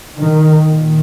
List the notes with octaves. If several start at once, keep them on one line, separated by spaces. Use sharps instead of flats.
D#3
A#2 D#3